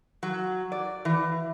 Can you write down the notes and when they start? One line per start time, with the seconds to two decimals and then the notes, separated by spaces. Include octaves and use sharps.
0.23 F#3
0.72 D5
1.05 E3